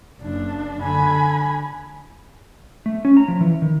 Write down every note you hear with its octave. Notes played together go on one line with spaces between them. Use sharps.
F#1 D4
D3 G#5 B5
A3
C#4
A#5
F3
E3
D#3